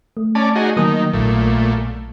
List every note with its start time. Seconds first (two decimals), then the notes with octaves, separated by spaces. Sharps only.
0.17 A3
0.35 C#4 D5 A5
0.56 D#4 F#4 G#4
0.77 D#3 F#3 A#3 D#6
1.13 A#1 A#2 A3